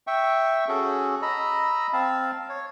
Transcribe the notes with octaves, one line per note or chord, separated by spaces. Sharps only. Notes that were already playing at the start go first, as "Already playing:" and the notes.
E5 G5 C#6
C#4 F#4 G#4 A4
D#5 A#5 B5 E6
C4 F5 A5
C#5